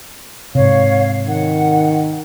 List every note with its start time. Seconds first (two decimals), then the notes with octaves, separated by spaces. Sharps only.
0.55 G#2 C3 C#5 F5
1.27 D#3 F#5